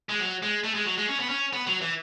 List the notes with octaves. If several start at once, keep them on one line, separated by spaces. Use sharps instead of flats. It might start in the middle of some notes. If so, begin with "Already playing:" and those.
G#3
F#3
G#3
A3
G#3
F#3
G#3
C#4
B3
C#4
B3
F#3
E3